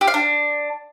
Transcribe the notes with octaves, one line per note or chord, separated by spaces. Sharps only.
G4
F5
D4